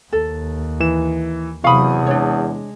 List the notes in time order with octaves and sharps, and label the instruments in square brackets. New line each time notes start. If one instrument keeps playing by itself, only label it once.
[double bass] D#2 [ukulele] A4
[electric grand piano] E3 E7
[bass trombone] E2 [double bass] C3 F#3 [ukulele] F5 B5 [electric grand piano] C#6 D#6
[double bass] G#3 [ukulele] D4 C#5